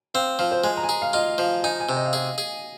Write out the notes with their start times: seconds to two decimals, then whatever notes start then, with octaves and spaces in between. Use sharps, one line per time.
0.14 C4 F5
0.39 F3 F5
0.52 C5
0.64 G#3 G#5
0.77 A#5
0.83 G#5
0.89 G#4 A#5
1.02 F5
1.13 F4 D#5
1.38 F3 F5
1.63 D#4 G#5
1.80 G#5
1.89 C3
1.96 D#5
2.06 F5
2.13 G#4 D#5
2.38 G#4